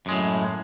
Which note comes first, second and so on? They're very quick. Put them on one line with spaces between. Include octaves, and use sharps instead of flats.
F#2 G#3 A2